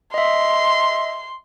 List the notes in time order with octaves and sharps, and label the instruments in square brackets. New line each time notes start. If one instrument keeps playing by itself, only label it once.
[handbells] D#5 E5 [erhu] C6